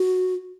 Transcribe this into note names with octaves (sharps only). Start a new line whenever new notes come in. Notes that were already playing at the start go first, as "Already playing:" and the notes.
Already playing: F#4